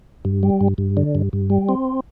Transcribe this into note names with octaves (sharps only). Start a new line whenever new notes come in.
G2
G3
G2
G2
D3
G2
G2
G3
C4